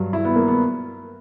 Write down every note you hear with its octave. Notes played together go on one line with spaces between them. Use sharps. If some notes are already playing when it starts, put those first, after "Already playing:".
Already playing: G2 F#3
E4
B3
A#3
B3